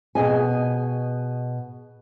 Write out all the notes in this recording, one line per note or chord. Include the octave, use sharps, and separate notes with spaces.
B2 G#4 D#5 G#5